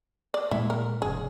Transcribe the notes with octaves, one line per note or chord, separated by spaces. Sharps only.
D5
A#2 G#3 A#3 E4
A#4
F1 G#2 C#3 G#4